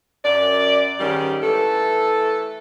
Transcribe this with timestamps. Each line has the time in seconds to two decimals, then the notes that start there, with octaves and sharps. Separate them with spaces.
0.24 F#2 D5
0.99 G#2 D#3 G3 C#4 G4
1.42 E3 A3 A4